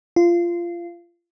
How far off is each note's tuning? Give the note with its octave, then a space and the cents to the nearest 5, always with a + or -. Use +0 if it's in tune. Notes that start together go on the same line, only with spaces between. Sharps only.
F4 -20